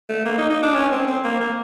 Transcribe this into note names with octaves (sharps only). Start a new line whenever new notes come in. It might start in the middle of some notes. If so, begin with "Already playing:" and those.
A3
A#3
D#4
D#4
D4
C#4
C4
C4
A#3
A#3